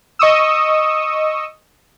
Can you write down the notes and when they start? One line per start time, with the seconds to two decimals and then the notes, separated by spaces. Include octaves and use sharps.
0.19 D#5 C#6 D#6 E6